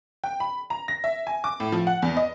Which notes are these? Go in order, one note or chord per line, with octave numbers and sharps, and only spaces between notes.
G5
B5
A#5
A#6
E5
G#5
D6
A2
F3
F#5
E2
D#5